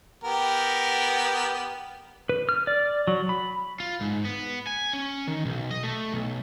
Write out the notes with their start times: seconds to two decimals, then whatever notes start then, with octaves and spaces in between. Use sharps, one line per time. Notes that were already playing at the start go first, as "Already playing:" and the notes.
0.24 B3 G4 A#4
2.29 B4
2.49 F6
2.67 D5
3.08 F#3
3.29 B5
3.80 F4
4.01 G#2
4.25 B3
4.67 G#5
4.93 C#4
5.27 D#3
5.45 B1
5.71 D#5
5.83 A3
6.12 B1